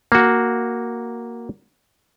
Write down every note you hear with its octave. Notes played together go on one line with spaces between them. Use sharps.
A#3 F#4